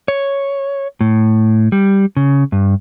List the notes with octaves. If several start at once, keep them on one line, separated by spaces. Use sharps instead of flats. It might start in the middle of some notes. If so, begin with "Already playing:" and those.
C#5
A2
G3
C#3
G2